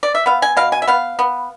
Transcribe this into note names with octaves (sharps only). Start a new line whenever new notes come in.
D5
E5
B3 F5
G#5
B2 F5
G#5
E5
B3 F5
B3